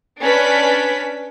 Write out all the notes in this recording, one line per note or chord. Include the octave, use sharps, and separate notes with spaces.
C#4 D4 B4 B6